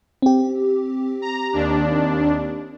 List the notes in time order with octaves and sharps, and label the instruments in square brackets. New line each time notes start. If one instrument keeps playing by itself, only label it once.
[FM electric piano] C4 G4
[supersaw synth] A#5
D#2 D4